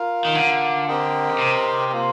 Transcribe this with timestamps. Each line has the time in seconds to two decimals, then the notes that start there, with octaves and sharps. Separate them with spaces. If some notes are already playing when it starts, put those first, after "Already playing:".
Already playing: F4 A#4 F5
0.25 D#3
0.35 D3
0.88 C4 G4 A#4 D#5 G5
1.39 C3
1.92 A#3 F4 C5